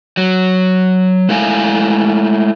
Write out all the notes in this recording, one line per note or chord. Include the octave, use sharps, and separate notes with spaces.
F#3
G#3 A3 E4 F5 G#5